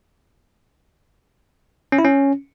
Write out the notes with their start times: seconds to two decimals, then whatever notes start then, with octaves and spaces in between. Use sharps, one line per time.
1.92 C#4
1.98 E4
2.05 C#4